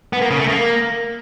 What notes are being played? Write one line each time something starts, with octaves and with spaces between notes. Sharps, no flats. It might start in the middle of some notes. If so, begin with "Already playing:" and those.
B3
A#3
C#3
A3
A#3